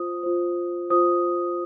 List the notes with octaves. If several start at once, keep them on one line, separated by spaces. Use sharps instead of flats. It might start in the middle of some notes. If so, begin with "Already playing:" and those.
Already playing: F4 C5 D#6
F4 C5
F4 C5 D#6